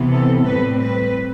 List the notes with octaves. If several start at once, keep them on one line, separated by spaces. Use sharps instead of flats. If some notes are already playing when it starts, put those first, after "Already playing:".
Already playing: C3 E3 B3
A4
A2 G3 C4 B4
B4